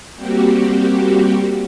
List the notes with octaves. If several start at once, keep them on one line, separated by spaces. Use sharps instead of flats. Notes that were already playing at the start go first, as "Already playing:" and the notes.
G3 A#3 C4 F#4 G4